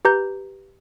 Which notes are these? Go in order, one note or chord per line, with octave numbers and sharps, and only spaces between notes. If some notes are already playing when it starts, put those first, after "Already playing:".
G4 B4 A#5 G6